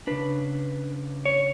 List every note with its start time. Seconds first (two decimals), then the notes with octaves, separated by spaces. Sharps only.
0.07 C#3 G#3 D4 B4
1.26 C#5